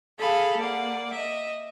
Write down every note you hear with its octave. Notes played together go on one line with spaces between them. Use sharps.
G#4 A4 F5 B5
A#3 D5 F#5
D#5 E5